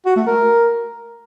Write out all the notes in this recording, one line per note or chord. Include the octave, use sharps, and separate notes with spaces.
F#4
A3
A#4